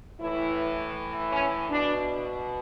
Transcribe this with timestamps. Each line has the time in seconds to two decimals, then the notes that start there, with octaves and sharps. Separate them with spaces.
0.20 A2 E3 E4
1.32 C#4
1.69 B2 D4